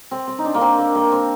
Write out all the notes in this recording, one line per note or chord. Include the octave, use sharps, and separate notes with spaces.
C4
C4
D#4
D4
A#3
C4
A#3
A#3
C4